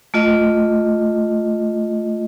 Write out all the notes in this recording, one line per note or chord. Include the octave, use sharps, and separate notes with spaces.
A3 F4 D#5